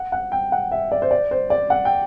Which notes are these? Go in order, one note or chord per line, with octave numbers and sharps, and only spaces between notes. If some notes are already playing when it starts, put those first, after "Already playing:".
Already playing: F#5
F#5
G5
F#5
E5
D5
C5
D5
C5
D5
F#5
G5